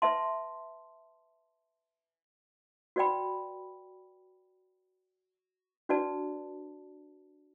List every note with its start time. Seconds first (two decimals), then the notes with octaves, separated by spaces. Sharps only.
0.02 B4 E5 A5 C6
2.96 F#4 B4 D5 G5 B5
5.89 D4 F#4 B4 D5 A5